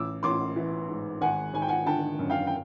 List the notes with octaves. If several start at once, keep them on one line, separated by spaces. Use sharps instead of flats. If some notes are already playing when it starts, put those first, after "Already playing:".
Already playing: A1 D6 E6
A1 C6 D6
E3
G#2
G#1 F#5 G#5
G#1 G#5
G5
F#5 G#5
D3 G5 A5
F#2
F5 G5
G5